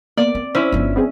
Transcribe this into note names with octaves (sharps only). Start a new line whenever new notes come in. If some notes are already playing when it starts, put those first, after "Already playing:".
A#3 B3 D5
C4
C#4 E4 C5 E6
G1 F3
B3 C4 G#4